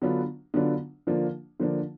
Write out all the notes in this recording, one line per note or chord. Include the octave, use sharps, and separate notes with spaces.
D3 F#3 B3 D4 F4
D3 F#3 B3 D4 F4
D3 F3 A#3 D4 F4
D3 F3 A#3 D4 F4